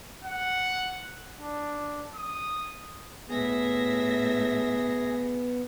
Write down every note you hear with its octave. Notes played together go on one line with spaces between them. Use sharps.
F#5
D4
D#6
A2 B3 G#4 E5 A#6